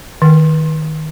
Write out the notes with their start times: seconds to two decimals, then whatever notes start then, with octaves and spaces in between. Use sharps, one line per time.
0.22 D#3